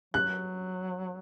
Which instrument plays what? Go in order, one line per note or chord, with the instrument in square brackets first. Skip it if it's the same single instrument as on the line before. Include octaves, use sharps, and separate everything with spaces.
[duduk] F#3 [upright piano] F#6